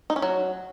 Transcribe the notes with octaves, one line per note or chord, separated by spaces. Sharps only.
D#4
C#4
F#3